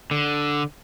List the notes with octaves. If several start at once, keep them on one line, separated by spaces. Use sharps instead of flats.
D3